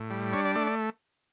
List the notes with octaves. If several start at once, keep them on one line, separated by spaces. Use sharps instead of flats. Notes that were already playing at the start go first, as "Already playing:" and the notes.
Already playing: A2
G3
D4 C#5
D5
A3 D5
D5